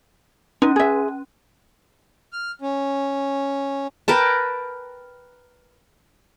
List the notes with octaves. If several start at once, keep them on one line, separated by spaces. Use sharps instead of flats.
C#4 D#4
G#4 E5
F6
C#4
A#4 B4 G5 A5